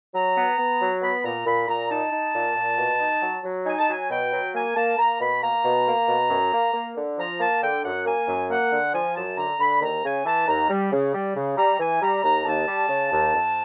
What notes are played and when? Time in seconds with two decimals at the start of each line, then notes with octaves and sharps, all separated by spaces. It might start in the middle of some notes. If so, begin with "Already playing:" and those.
0.14 F#3 A#5
0.35 B3
0.58 B3
0.80 F#3
1.01 B3 B5
1.23 A#2 A#5
1.46 A#2 B5
1.68 A#2 A#5
1.89 D#4 A5
2.12 D#4
2.34 A#2
2.55 A#2
2.78 B2
3.00 D#4
3.22 F#3
3.43 F#3
3.65 D#4 G#5
3.77 A5
3.88 F#3 G#5
4.09 B2 G5
4.32 F#3
4.54 A#3 G#5
4.75 A#3 A5
4.98 A#3 A#5
5.20 B2 B5
5.41 A#3 A#5
5.64 B2
5.86 A#3
6.07 B2
6.29 F#2
6.52 A#3
6.73 A#3
6.96 D3
7.18 F3 A#5
7.39 A#3 A5
7.61 D3 G5
7.83 F#2 F#5
8.06 A#3 G#5
8.27 F#2
8.50 A#3 F#5
8.71 D3
8.93 F3 G#5
9.15 F#2 A5
9.37 D3 A#5
9.59 D3 B5
9.81 D#2 A#5
10.04 C#3 G#5
10.25 E3 A5
10.48 D#2 A#5
10.70 G3
10.92 C#3
11.14 G3
11.36 C#3
11.57 G3 A#5
11.79 E3 G#5
12.02 G3 A#5
12.23 D#2 A#5
12.45 D#2 A5
12.67 G3
12.89 C#3
13.12 D#2
13.33 F2